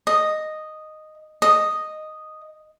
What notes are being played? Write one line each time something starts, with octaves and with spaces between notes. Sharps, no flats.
D#5
D#5